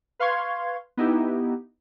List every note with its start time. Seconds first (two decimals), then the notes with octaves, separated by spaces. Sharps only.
0.19 B4 F5 C6 C#6 G#6
0.97 B3 D#4 E4 G4